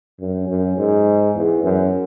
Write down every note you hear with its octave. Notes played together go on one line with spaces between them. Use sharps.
F#2
F#2
G#2
E2
F#2